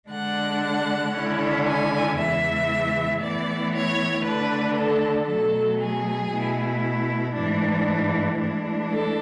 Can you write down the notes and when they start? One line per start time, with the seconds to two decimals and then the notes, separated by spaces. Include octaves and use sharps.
0.11 D3 G#3 D4 F#5
1.15 D3 G#3 C#4 E4
1.67 G#5
2.17 E2 C#3 E3 G#3 E5
3.21 A2 E3 B3 E4 D5
3.73 C#5
4.24 D3 A3 D4 B4
4.76 A4
5.28 B2 F#3 A3 A4
5.80 G#4
6.32 B2 A3 E4
7.35 G#2 E3 A3 D4
8.39 A2 E3 G#3 D4
8.90 A4